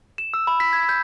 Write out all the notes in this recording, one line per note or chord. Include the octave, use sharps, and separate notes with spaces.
E7
E6
B5
B6
G#6
G6